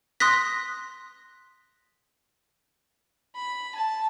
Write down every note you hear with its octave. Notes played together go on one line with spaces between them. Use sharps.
C6 D#6 F#6 A#6 B6
B5
A5